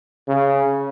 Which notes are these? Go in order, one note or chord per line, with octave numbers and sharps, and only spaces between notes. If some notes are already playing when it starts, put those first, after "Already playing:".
C#3